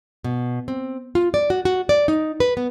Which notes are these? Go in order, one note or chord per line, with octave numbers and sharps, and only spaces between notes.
B2
C4
F4
D5
F#4
F#4
D5
D#4
B4
B3